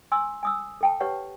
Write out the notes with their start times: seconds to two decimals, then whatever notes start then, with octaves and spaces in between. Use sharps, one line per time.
0.12 G#5 C6 E6
0.43 G#5 D#6 E6
0.81 A4 G5 A5
1.00 G4 B4 C#5 F#5